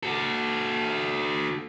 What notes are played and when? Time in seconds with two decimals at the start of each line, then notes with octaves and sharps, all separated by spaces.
0.03 F#4 A4